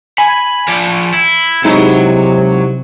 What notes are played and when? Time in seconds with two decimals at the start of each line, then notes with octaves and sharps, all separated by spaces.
0.18 G#5 B5
0.68 F3 D5
1.14 E4
1.64 C3 F#3 G#3 D#4 E4